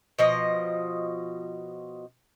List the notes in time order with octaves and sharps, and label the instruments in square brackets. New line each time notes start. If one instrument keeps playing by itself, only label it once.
[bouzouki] B2 F3 D#5